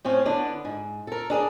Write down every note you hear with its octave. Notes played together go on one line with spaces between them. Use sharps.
A2 C4 C#4
D3 B3 D4
G#2
A4 A#4
D4 G#4 A#4 D5